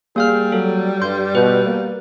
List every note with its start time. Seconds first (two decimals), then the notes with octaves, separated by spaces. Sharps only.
0.16 G3 A#3 G#4 F5 F6
0.52 F#3 A4
1.02 G2 C6 G6
1.35 B2 B4
1.65 A#3